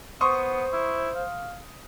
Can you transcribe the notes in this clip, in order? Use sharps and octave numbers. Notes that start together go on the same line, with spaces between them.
B3 C5 C6 C#6 D#6
E4
F5